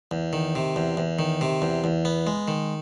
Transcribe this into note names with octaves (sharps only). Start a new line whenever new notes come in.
E2
D#3
C3
E2
E2
D#3
C3
E2
E2
B3
G#3
D#3